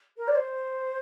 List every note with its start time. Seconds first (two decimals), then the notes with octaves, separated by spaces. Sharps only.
0.17 A#4
0.27 D5
0.35 C5